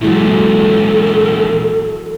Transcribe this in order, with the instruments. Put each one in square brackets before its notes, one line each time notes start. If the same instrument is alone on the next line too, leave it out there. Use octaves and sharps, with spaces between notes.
[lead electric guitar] E2 A#2 [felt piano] F#3 G#3 E4 [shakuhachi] A4